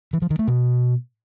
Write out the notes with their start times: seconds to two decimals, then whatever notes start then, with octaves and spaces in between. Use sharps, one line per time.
0.13 E3
0.22 F3
0.30 D#3
0.39 A3
0.48 B2